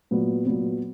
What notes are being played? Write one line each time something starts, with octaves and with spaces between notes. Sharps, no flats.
A#2 F#3 B3
A#2 F#3 B3